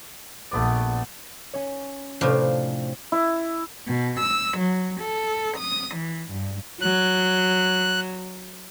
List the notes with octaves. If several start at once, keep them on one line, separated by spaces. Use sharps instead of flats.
A#1 A3 B3 D5
C#4 C#5
A2 C3 F3 D4 F5
E4
B2
E6
F#3
A4
D#6
E3
G2
F#3 F#6